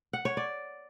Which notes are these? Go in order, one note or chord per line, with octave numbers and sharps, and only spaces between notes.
F#5
C#5
D5